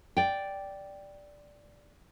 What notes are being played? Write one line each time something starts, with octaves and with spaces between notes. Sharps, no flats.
D5 G5